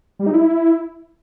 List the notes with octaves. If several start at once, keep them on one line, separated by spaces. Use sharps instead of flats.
G3
D#4
E4